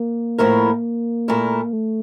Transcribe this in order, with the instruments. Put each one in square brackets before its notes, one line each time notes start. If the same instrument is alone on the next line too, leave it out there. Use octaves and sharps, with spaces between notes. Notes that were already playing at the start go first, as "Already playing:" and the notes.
Already playing: [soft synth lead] A#3
[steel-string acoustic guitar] A2 F3 A3 E4 A#4
A#2 A3 E4 A#4
[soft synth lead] A3